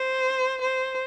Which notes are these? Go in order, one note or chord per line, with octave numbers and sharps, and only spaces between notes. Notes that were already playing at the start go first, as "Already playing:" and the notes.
Already playing: C5
C5